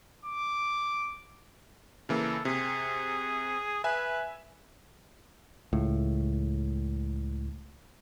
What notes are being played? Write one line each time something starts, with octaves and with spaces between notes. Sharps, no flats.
D6
C#3 E3 A#3 A4
C3 G#4
B4 E5 G#5
C#2 A2